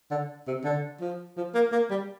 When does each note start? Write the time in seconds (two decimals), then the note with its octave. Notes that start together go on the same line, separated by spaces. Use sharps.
0.11 D3
0.47 C3
0.64 D3
1.01 F3
1.37 F3
1.54 A#3
1.72 A#3
1.90 G3